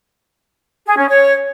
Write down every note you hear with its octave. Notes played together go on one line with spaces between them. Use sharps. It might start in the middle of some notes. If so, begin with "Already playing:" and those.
G#4
C#4
C#5